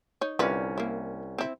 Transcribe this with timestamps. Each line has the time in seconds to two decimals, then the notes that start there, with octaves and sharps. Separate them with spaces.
0.21 D#4 C#5
0.39 C2 D3 C#4 F4 B4
0.78 A#3 E4
1.38 C4 E4